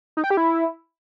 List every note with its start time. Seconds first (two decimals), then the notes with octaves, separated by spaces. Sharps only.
0.17 D#4
0.24 G5
0.30 G4
0.37 E4